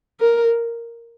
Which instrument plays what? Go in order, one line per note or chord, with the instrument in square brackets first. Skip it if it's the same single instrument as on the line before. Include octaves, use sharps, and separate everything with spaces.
[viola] A#4